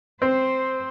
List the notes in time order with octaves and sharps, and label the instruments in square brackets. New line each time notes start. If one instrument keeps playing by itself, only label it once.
[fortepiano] C4 [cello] C5